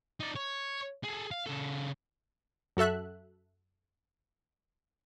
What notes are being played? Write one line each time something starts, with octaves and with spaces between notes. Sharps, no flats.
D#4 D5
C#5
G#4 A4
F5
C#3 A4
F#2 F#4 A4 E5 F#6